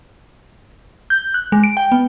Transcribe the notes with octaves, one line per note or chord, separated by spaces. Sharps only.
G6
F#6
G#3
D7
G5
B3